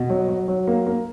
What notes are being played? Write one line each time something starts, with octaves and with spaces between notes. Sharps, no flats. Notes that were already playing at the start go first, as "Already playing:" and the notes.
Already playing: B2
F#3
F#3
F#3
A#3
A#3